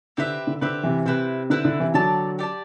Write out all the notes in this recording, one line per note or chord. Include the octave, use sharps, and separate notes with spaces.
D3 C4 G4 B4 E5
D3
D3 C4 G4 B4 E5
C3 E3
C3 C4 E4 B4
D3 C4 E4 B4
D3
C3 E3
D3 F#3 G4 D5 A5
G4 D5 A5